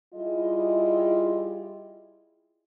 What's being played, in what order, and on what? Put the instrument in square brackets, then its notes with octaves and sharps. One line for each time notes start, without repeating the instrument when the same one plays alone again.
[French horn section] G3 E4 F4 G#4 D#5